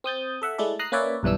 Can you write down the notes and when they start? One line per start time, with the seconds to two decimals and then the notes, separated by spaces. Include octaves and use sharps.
0.04 C4 D#6 G6 A6
0.42 A4 E5 F#5
0.58 G#3 A3 E4 A4 D5
0.79 A#5 D#6 F#6 C7
0.92 A#3 C#4 B4 C#5 D5 E5
1.23 B1 G2 E3 D4 E6